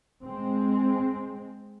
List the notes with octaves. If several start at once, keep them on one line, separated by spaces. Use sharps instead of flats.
G#3 C4